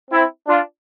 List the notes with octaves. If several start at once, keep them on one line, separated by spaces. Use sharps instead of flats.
C4 E4
D4 F4